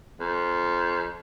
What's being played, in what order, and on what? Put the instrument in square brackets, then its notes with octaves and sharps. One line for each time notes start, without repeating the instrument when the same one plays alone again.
[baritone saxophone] F2